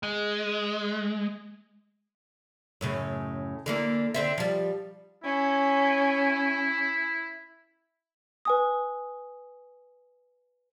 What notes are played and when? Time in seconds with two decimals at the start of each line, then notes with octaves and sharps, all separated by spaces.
0.03 G#3
2.81 F#2 A2 C#3
3.66 D3 E3 A#3
4.14 D3 C4 E5
4.38 F3 G3
5.24 C#4 E4
8.45 B4 G#5 D#6